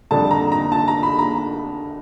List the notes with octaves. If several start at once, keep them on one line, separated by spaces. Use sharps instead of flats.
F2 D3 G3 A5
A#5
A#5
A5
A#5
B5
A#5